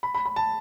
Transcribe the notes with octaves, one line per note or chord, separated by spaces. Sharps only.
B5
B5
B5
A5